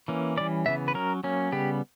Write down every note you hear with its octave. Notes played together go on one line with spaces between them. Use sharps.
E3 A#3 C#4
E3 G3 C#4 D5
C#3 E3 B3 E5
B4
F#3 C#4 A#4
F#3 A#3 C#4
C#3 G3 B3 G4